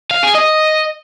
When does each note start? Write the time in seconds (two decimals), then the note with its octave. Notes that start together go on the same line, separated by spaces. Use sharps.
0.11 F5
0.23 G#4
0.35 D#5